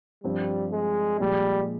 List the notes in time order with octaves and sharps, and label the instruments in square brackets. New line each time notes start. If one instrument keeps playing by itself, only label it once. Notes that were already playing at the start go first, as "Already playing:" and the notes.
[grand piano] G2 F3 C4 [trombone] G3
[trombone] G#3
[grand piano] A#2 F3 G#3 [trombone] G3